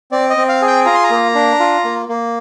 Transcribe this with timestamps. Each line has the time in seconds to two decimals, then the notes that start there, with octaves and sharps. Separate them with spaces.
0.12 C4 D5
0.30 D#5
0.37 C4
0.49 F5
0.62 G#4
0.67 G5
0.86 F4 A#5
0.95 C6
1.04 A#5
1.10 A#3
1.35 D4
1.60 F4
1.84 A#3
2.09 A#3